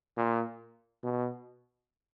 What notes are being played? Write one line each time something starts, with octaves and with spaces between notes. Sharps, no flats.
A#2
B2